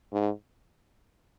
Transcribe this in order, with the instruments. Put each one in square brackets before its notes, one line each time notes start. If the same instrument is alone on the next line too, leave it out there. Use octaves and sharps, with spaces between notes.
[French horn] G#2